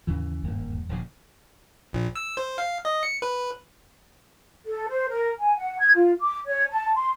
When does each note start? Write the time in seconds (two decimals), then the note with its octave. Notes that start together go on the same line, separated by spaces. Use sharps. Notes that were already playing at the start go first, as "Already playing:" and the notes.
0.07 D#2 G#2 C#3 E3
0.43 D#1 G#1 E2 G2 A#3
0.89 D#1 A#1 C#3
1.93 A#1
2.16 E6
2.37 C5
2.58 F5
2.85 D#5
3.03 C#7
3.22 B4
4.66 A4
4.88 C5
5.09 A#4
5.39 G#5
5.56 F#5
5.79 G#6
5.94 F4
6.20 D6
6.46 C#5
6.69 A5
6.95 C6